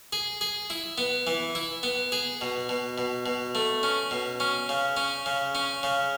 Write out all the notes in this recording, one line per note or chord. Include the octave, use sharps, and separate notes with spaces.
G#4
G#4
E4
B3
E3
E4
B3
G#4
B2
B2
B2
B2
A3
C#4
B2
C#4
C#3
C#4
C#3
C#4
C#3